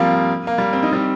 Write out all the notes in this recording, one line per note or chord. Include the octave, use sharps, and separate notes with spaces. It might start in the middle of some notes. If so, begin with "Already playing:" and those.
Already playing: F3 G3 A#3 C4
A#3
G3
C4
D#4
G3 C4